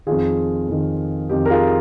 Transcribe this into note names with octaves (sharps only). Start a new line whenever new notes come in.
F2 D#3 F4 G#4
F2 D#3
F2 D#3 G4
A#4
F4 G#4